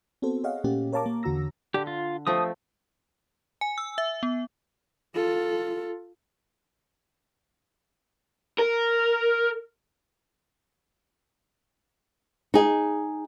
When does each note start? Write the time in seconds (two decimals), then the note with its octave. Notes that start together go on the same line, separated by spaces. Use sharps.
0.22 B3 C4 F#4 A4 C5
0.44 G#4 C#5 D#5 F5 F#5
0.64 A#2 A3 A#3 C#4 G4
0.93 A#4 C#5 F5 A5 A#5 D6
1.06 A#3
1.23 E2 D3 F#4 A#5 E6 A#6
1.74 D3 G4
1.87 F4
2.27 F3 A3 C4 D#6
3.61 G#5
3.78 E6
3.98 E5
4.23 B3
5.15 F4 A4
8.58 A#4
12.54 D#4 G#4